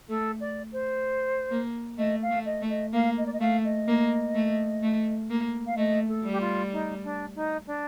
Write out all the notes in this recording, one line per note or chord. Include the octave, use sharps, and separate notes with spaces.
A3 A4
D5
C5
A#3
A3 D#5
F5
A3
D#5
A3
D#5
A#3 F5
D#5
D5
D#5
A3 F5
D#5
A#3
A3
A3
A#3
F5
A3 D#5
A4
G3
G4
F4
D#4
D4
D#4
D4